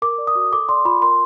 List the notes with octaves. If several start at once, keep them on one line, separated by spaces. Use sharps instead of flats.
A#4 D6
D5
D#6
F#4
A4 D6
D5 C6
F4 B5
A#4 C6